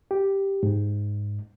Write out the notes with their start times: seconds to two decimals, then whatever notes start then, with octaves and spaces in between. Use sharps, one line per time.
0.11 G4
0.63 G#2